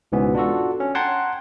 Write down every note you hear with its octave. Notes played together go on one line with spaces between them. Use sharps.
C#2 G#2 B2 E3 B3 C#4
D4 F4 F#4 A4
C#4
F#5 G5 A5 A#5 C6 G#6